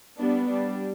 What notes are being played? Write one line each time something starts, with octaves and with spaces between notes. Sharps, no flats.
G3 B3 D4
G3 D4